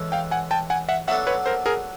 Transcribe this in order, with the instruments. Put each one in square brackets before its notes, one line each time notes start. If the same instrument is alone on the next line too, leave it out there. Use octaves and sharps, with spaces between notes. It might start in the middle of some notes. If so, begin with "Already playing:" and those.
Already playing: [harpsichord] E3 G#3 C#4 A4
[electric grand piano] F5 G5
F#5 G#5
G5 A5
F#5 G#5
E5 F#5
[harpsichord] F#3 B3 D4 F#4 A4 [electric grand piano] E5 F#5
[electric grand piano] B4 C#5
A#4 C5
G#4 A#4